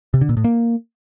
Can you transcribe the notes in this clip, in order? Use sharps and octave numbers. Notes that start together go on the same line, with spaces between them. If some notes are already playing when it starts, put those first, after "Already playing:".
C3
D3
A#2
A2
A#3